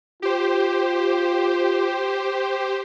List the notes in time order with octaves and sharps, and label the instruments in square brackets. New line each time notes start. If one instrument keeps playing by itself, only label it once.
[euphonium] F4 [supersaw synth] G4 C5